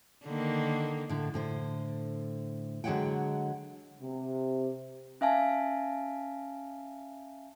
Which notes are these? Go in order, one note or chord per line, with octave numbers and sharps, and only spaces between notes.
D3 D#3 A#3
A2 D3
A2 D3 C5
D3 F#3 G#3 C#5 F#5 G5
C3
C#4 E5 F5 G#5 A5